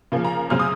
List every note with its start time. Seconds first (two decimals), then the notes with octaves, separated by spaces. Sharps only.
0.12 C#3 F3 A#3
0.25 A#5
0.50 F#2 C#3 F#3 C4 F6
0.59 D#6